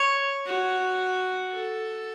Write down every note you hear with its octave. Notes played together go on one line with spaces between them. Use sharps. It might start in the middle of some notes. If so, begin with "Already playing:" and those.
Already playing: C#5
F#4
A4